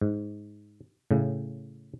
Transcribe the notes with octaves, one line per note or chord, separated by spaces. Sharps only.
G#2
A2 C#3